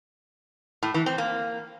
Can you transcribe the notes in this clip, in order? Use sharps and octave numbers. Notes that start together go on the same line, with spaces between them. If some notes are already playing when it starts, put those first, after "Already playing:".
A2
E3
C4
A#3